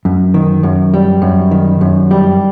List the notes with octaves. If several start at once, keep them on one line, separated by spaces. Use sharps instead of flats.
F#2
D#3
F#2
G3
F#2
D#3
F#2
G3